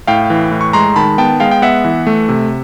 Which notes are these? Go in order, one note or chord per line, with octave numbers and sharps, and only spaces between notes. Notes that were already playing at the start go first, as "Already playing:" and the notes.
A2 F5 G5
E3
A2
C#6
G#3 A#5 C6
D#3 A5 B5
B3 G5 A5
G#3 F5 G5
G5
B3 E5 F#5
E3
A3
C3